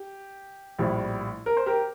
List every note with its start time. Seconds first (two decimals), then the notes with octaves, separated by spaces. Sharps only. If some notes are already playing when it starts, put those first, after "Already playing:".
Already playing: G4
0.79 A#1 A2 G3
1.46 A#4
1.57 C5
1.66 G4 A#4